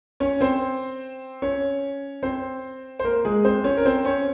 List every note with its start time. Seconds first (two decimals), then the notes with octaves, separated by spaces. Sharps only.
0.20 C#4 C#5
0.41 C4 C5
1.42 C#4 C#5
2.23 C4 C5
2.99 C5
3.04 A#3 A#4
3.25 G#3 G#4
3.44 C4 C5
3.64 C#4 C#5
3.77 A#4
3.85 C4 C5
4.05 C#4 C#5